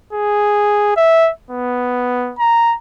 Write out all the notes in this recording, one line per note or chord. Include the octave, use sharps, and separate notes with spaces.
G#4
E5
B3
A#5